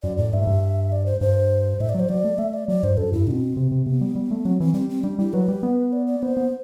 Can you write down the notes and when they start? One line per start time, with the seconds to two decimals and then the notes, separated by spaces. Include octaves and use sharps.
0.03 F#2 D5
0.17 A2 D5
0.33 G2 E5
0.41 A2
0.47 G2
0.92 D5
1.06 C5
1.21 G2 C5
1.80 A2 E5
1.89 D5
1.94 F#3
2.00 C5
2.09 F#3 D5
2.24 A3
2.38 A3 E5
2.54 D5
2.68 F#3 D5
2.83 G2 C5
2.97 F#2 A4
3.12 G2 E4
3.27 B2 C4 D4
3.57 C3
3.72 C3
3.86 C3 B3
4.01 G3
4.16 G3
4.31 A3
4.45 F#3 C4
4.60 E3 C4
4.74 G3 C4
4.89 C4
5.04 G3 D4
5.19 G3 E4
5.33 F#3 B4
5.48 G3
5.63 B3
5.93 D5
6.07 D5
6.22 B3 C5
6.37 B3